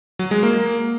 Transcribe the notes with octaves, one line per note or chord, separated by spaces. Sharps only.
F#3
G#3
A#3